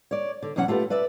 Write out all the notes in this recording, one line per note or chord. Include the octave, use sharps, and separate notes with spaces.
C#5 D5
D3
E2 B2 F#3 C#4 F#4 F#5
A3 F4 G4 B4
B4 D5 E5